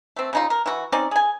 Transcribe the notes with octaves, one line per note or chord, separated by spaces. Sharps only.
A3 C4
C#3 D#4 F4
A#4
E3 F#4
C4 C#4 D#4 D5
G#4 G#5